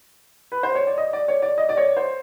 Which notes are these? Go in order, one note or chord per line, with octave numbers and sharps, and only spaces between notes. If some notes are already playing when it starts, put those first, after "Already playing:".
B4
C5
C#5
D5
D#5
D5
C#5
D5
D#5
D5
C#5
C5